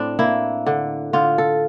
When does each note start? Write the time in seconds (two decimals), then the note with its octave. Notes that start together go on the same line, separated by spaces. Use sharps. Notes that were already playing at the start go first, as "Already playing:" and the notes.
Already playing: A2 C4 D4
0.19 A#3 E4
0.67 D3
1.13 D3 F4
1.38 A4